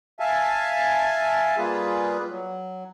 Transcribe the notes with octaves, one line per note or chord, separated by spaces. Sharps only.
E5 F5 G#5 A5
G3 A#3 F4 G#4 B4
F#3